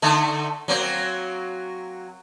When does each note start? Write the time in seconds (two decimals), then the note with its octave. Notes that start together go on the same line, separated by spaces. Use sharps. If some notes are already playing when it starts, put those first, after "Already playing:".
0.02 D3 A3 D#4
0.68 F#3 A#3 C4